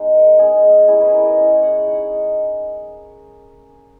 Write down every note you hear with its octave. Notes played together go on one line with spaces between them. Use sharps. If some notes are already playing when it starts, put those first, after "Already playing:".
Already playing: G#3 B3 C#4 D#4
A#4
G#3 B3 D#4 G#4
G#3 C#4 E4 G#4
B4
A#4
D#5
G#3 C#4 E4
F#5
G#3 D#4 F#5